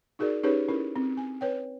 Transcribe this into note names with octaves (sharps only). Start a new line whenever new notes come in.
D#4 F#4 G#4 A#4 D5
C#4 D#4 G4 G#4 B4 C#5
C#4 E4 A#4
C4
G#5
B4 C#5 G5